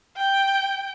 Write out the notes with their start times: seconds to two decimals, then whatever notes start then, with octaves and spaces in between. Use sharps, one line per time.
0.17 G5